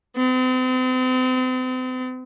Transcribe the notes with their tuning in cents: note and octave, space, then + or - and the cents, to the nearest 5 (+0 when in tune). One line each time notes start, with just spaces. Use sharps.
C4 -40